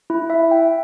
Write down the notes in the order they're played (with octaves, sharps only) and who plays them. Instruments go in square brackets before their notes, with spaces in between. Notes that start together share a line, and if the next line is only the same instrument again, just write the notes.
[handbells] E4
E5
G5